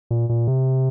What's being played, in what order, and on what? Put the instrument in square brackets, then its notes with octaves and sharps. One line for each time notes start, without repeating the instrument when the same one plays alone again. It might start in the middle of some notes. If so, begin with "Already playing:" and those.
[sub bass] A#2
A#2
C3